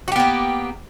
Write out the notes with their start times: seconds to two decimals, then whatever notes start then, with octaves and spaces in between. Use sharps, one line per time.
0.08 F#4
0.12 G4
0.16 B3
0.20 A#3